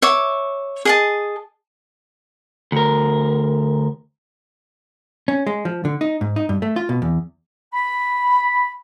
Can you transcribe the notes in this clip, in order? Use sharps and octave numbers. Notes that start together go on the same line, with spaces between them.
C#5 E5 D6
G#4 D#5 A5
D2 A#4
C#4
G#3
F3
D3
D#4
G#2
D#4
G2
A3
F4
B2
E2
B5